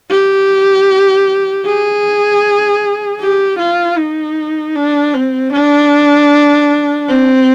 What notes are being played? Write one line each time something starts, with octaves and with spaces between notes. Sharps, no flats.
G4
G#4
G4
F4
D#4
D4
C4
D4
C4